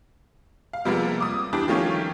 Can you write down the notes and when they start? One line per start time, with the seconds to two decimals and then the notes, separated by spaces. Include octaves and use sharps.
0.73 F5
0.85 C3 F3 G3 G#3 A#3 B3
1.21 D6 D#6
1.53 E3 G3 D4 G4
1.68 D#3 F3 A3 C#4 F4 G4